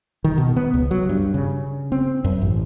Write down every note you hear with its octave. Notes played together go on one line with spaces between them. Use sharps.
D#3
B2
B3
C#2
F#3
G2
C#3
C4
F#2
A1